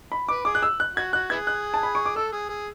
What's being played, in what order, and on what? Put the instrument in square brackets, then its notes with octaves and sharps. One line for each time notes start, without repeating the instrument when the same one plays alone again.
[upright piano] B5
[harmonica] B4 [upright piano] D6
[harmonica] G#4 [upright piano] D6
[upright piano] F#6
E6
F#6
[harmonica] F#4 [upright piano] G#6
[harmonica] F#4 [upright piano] F#6
[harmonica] B3 E4 G#4 [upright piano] G#6
[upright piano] F#6
A5
B5
C#6
D6
[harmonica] A4 [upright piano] E6
[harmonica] G#4
G#4